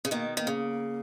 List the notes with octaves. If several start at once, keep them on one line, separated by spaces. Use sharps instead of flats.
C#3
B2 D#3 A#3
D#3 A#3
C#3